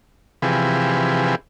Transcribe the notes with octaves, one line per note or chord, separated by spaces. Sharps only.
C3 E3 F3 G4 G#4 B4